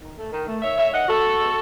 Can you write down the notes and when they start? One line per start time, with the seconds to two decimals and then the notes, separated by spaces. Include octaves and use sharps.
0.01 D#3
0.17 A3
0.32 D#3
0.47 A3
0.62 D#3 C#5 E5
0.77 A3 C#5 E5
0.93 D#3 D#5 F#5
1.08 A3 F#4 A4
1.24 B2
1.39 G#3 B3